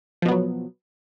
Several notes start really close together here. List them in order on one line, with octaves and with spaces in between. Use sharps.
F3 B2 B3 F#3